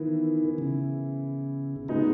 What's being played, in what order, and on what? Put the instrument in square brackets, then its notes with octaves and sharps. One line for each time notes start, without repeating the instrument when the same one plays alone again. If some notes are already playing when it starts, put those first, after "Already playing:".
Already playing: [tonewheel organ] D#3 [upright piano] E3 B3 E4
[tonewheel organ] C#3
[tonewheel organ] C#3 [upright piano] G#3 B3 D#4